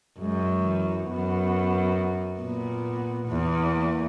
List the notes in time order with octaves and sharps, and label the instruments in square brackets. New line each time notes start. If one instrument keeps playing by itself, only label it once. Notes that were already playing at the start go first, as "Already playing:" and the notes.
[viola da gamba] F#2 [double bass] G#3
[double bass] E3
[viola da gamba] F#2 [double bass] B3
[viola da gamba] A#2 [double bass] B3
[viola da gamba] E2
[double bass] A#3